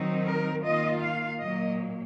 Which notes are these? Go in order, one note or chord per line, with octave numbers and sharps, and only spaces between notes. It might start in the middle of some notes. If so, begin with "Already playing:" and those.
Already playing: D#3 F#3 C4 D#4
A#4
D#3 A#3 F4 D#5
F5
A#2 F#3 A#3 D#5